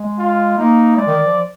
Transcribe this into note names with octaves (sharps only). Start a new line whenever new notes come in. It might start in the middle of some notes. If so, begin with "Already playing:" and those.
Already playing: G#3
F4
A#3 D#4
G#3 D5
D#3
F3